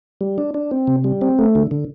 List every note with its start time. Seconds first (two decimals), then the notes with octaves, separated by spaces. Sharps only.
0.21 G3
0.38 D4
0.54 D4
0.71 C4
0.87 C3
1.04 G3
1.21 C4
1.39 A3
1.55 D3
1.71 D3